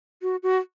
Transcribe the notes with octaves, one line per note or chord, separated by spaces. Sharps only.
F#4
F#4